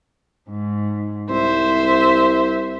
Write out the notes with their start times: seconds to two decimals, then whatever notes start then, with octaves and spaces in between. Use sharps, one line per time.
0.49 G#2
1.30 C2 C5 E5